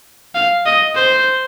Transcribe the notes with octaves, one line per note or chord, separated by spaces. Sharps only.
F5
D#5
C5